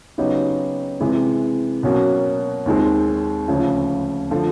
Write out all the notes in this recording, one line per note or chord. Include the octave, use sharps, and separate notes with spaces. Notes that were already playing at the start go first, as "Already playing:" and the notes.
C#3 F#3 B3 D#4 G4
C3 E3 G#3 C4
B2 F#3 A#3 C#4 F#4
D#2 D#3 G#3 C4
D2 C#3 F3
D3 F3 A3